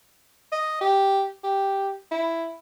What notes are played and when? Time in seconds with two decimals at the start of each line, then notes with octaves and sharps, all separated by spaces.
0.52 D#5
0.81 G4
1.44 G4
2.11 E4